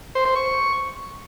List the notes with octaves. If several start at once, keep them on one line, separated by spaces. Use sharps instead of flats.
C5
C5
C#6